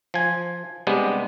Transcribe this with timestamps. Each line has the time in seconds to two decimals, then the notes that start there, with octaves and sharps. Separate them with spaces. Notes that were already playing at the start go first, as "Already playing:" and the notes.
0.14 F3 G#5
0.87 C3 G3 G#3 B3 D4